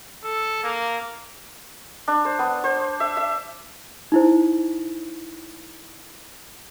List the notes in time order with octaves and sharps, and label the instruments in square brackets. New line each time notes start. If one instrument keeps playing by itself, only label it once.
[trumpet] A4
A#3
[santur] D4
C5
B3
C5
E5
E5
[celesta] D#4 E4 C5